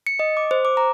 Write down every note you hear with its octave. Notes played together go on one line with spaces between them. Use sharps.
C#7
D#5
D6
C5
D6
A#5